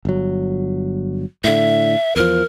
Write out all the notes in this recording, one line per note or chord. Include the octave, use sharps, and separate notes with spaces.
G1 F#3
A2 D3 E5
E2 F3 A#4